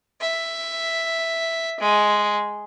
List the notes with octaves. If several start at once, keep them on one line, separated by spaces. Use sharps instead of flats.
E5
G#3